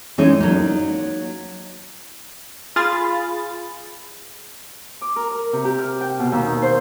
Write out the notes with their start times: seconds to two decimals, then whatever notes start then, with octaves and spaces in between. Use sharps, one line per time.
0.18 E3 G#3 C#4 D#4
0.40 F#3 A#3 D#4
2.76 F4 G#4 B5 A6
5.01 D6
5.16 A#4
5.31 A#4
5.53 C3
5.65 G4
5.78 F6
6.01 G5
6.19 B2
6.32 D#2
6.47 D#4
6.62 C5